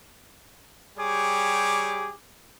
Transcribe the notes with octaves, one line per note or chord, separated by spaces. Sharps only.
G3 G4 G#4 C#5 D6